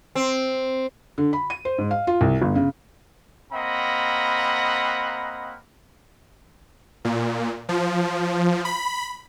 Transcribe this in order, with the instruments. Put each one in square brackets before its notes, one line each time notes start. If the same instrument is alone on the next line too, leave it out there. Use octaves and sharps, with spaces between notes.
[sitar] C4
[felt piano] D3
B5
D#7
C5
G#2
F5
F4
C2
G1
C#3
[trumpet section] A#3 C4 D#5 F#5 A#5 B5
[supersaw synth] A#2
F3
B5